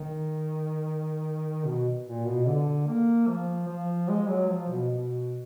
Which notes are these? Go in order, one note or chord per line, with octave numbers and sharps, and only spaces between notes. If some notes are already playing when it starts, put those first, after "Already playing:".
Already playing: D#3
B2
A#2
B2
D3
A#3
F3
F3
G#3
F#3
F3
B2
B2